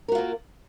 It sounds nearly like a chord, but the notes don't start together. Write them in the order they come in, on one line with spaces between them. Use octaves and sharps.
A#4 F#4 F4 A#3